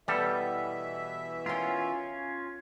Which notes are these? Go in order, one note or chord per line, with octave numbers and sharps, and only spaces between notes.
B2 E3 G3 B3 A4 E5
C#4 F4 A#4 G5